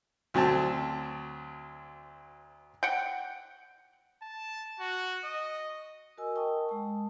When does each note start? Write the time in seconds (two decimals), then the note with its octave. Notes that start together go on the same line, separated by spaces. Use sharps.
0.34 D2 F#3 C4 A5
2.83 F#5 G5
4.22 A5
4.80 F#4
5.25 D#5
6.17 F#4 A#4 D#5 G#5 E6
6.35 A#4 D#5 G5 A5 C#6 D#6
6.69 G#3 A5